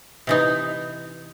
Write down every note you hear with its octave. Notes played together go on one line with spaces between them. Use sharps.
C3 E3 D#4